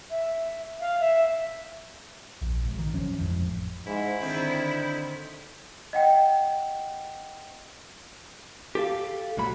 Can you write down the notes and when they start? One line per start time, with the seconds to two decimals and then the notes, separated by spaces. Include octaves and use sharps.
0.10 E5
0.80 F5
1.00 E5
2.42 A#1
2.63 G#1
2.79 D#3
2.94 D#1 F3 F#3 C#4
3.18 G#1 F2 A2 F3
3.86 G#2 E4
4.20 D3 D#3 C4
5.93 D#5 F#5 G5
8.75 G4 A4 F5
9.37 C2 A#2 F#3 B5